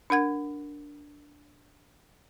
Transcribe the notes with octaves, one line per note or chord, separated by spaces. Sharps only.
D4 A#4 F#5 G#6